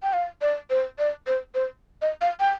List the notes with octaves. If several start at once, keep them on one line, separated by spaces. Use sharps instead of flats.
G5
F5
D5
C5
D5
C5
C5
D#5
F5
G5